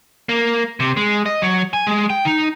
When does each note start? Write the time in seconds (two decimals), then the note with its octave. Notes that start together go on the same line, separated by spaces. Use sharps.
0.29 A#3
0.80 C3
0.97 G#3
1.26 D#5
1.42 F#3
1.73 G#5
1.87 G#3
2.10 G5
2.25 D#4